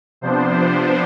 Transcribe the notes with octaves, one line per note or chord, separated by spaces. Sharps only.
C3 F3 B3 D4 C5
C5